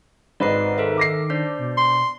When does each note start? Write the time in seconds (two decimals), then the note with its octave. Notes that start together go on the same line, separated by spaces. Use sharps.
0.40 G#1 G#2 D#3 B4 D5 D#5 C7
0.78 A4 A#4 E5
0.98 D6 A#6 C7
1.30 D4 C5 D5
1.59 B2
1.78 C6